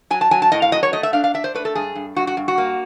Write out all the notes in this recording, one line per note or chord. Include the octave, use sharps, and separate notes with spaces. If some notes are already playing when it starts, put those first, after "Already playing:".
F#3 G#5
A5
F#3 G#5
A5
A2 D#5
F5
F#3 D#5
C#5
A3 D#5
E5
D4 F5
F5
D4 E5
C5
A3 B4
A4
G2 G#4
G2
G2 F#4
F#4
G2
F#4
A#3